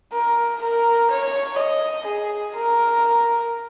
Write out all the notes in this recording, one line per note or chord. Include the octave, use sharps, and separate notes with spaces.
A#4
A#4
C#5
D#5
G#4
A#4